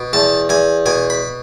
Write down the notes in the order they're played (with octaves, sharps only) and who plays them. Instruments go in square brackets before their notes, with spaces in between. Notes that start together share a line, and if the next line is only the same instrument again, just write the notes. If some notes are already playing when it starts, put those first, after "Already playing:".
Already playing: [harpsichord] B2
E2 A5
E2 G#5
B2 G#5
B5